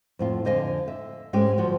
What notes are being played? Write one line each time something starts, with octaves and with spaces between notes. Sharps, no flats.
F2 A2 F4
F2 D3 C5 D#5 F5 G#5
E5
G#2 G#3 A3 C#4 G4
D2 F3 G3 F#4